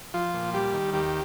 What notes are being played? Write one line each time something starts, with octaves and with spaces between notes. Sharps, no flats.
F3 F4
A#2
G3 G4
D#3
D#2 G4